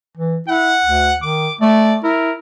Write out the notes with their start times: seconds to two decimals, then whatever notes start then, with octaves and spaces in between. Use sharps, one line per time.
0.18 E3
0.48 E4 F#5
0.84 D2
1.22 D#3 D6
1.61 A3 D5
2.04 E4 A#4